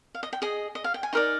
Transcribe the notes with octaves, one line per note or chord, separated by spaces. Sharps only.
F5
D#5
G5
G#4 D#5
D#5
F5
G5
G#5
D#4 A#4 D5 A#5